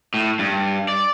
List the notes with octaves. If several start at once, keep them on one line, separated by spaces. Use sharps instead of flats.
A2
G2
D5